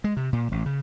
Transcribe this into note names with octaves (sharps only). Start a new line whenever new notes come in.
G#3
C3
A#2
A1
C#3